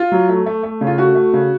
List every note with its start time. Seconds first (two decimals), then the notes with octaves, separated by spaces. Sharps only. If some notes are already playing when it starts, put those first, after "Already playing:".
Already playing: F4
0.12 F#3
0.29 A3
0.46 A3
0.63 A3
0.81 C#3
0.87 F4
0.98 A3 F#4
1.15 A3
1.34 C#3